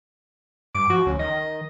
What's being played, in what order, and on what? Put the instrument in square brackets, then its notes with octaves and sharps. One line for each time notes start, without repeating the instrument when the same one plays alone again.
[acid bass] G2 [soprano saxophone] D6
[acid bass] F3 [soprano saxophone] F#4
[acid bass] D2 [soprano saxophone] C#4
[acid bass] D#3 [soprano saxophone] D#5